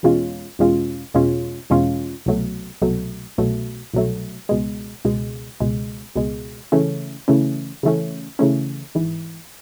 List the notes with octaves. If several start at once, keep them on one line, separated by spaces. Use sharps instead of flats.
E2 B2 G#3 C#4 F4
E2 B2 G#3 C#4 F4
E2 B2 G#3 C#4 F4
E2 B2 G#3 C#4 F4
C2 B2 F#3 A3
C2 B2 F#3 A3
C2 B2 F#3 A3
C2 B2 F#3 A3
C#2 B2 G#3
C#2 B2 G#3
C#2 B2 G#3
C#2 B2 G#3
C#3 E3 A3 C#4
C#3 E3 A3 C#4
C#3 E3 A3 C#4
C#3 E3 A3 C#4
G#1 G#2 E3